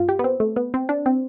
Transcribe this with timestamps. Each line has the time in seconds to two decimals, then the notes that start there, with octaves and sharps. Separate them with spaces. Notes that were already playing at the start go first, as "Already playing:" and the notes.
Already playing: G2 F4
0.09 G4
0.19 B3
0.24 C4
0.40 A3
0.56 B3
0.74 C4
0.89 D4
1.06 C4